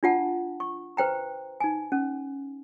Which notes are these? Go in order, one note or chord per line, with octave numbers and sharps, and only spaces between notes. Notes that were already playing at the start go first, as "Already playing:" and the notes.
D4 F4 F#5 A5
C#6
B4 C5 G5 A#5
D#4 G#5
C#4